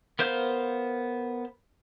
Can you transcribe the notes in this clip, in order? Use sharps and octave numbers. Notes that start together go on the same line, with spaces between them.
B3 A#4 C5 F5 G6